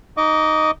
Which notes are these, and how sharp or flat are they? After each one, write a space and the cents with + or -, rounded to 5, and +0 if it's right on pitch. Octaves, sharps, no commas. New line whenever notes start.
D#4 +0 D#5 +0 D6 -30